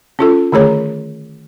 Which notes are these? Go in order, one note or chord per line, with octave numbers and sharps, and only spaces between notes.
C#4 F4 A4
D3 D#3 A3 G#4 C#5 A#5